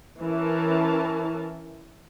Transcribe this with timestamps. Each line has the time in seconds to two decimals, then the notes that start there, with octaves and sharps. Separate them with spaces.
0.19 E3 C#4 E4 A#4 A5